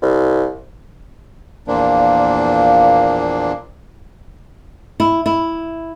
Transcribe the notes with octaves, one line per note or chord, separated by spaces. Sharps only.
C2
E2 A#2 F3 A#3 D4
E4
E4